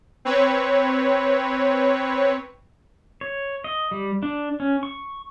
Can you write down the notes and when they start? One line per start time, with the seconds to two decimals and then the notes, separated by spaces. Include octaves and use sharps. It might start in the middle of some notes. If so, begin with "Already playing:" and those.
0.25 C4 B4 C#5
3.21 C#5
3.64 D#5
3.91 G3
4.23 D4
4.60 C#4
4.83 C#6